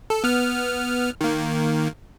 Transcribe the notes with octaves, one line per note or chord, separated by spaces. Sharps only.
A4
B3 F6
D#3 A#3